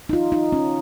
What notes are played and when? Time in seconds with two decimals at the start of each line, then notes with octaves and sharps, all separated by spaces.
0.09 D#4
0.13 F4
0.32 D#4
0.52 C#4